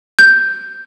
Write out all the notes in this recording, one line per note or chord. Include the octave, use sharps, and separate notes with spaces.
G6